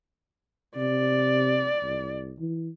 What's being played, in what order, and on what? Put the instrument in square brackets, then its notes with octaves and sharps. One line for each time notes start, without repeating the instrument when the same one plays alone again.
[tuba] C3 [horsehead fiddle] D5
[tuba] C2
E3